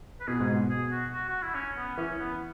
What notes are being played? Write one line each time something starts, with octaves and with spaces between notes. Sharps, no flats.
B4
B2 G#4
G#2
B2
G#4
F#4
F#4
F#4
E4
C#4
B3
E3 C#4
B3